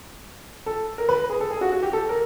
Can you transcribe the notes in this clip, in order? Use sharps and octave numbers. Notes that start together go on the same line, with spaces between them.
A4
A#4
B4
G#4
A4
G#4
F#4
F#4
G4
A4
A#4